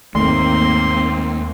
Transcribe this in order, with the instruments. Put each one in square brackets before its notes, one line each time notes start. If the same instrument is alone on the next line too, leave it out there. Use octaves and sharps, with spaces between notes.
[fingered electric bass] D#2 [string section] G#2 A#3 C4 [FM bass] A3 [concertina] C6